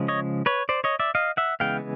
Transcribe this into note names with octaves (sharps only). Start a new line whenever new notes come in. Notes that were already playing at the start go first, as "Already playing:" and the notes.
Already playing: C#3 F3 G#3
C#5 D#5
B4 C#5
C5 D5
C#5 D#5
D5 E5
D#5 F5
E5 F#5
C#3 E3 G#3 B3 F5 G5